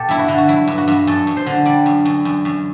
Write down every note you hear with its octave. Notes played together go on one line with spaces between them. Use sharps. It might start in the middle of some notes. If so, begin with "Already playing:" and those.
Already playing: B2 G4 A4
G2 E4
F#4
D3
F#4
F#3 E4
G2
F#4
G2
F#2 A4
F#2
C5
D3
G3 D5
F#2
F#2
F#2
F#2